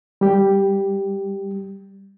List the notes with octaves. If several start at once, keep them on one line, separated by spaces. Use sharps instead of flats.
G3 G4